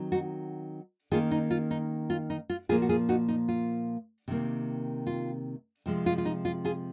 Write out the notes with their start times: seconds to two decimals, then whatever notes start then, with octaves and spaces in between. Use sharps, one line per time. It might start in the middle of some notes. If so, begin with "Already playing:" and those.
Already playing: D#3 F#3 C4
0.12 D#4 F#4
1.11 D#3 A#3 C#4 F4 G#4
1.31 D#4
1.51 F4
1.71 D#4
2.10 F4
2.30 D#4
2.50 F4
2.69 A#2 F3 A#3 F4 G#4
2.82 F#4
2.89 F4 G#4
3.09 D#4 F#4
3.29 D#4
3.49 F4
4.28 C3 D#3 A#3
5.07 F4
5.86 C3 F3 G#3
6.06 F4
6.18 F4
6.25 D#4
6.45 F4
6.65 F4 G#4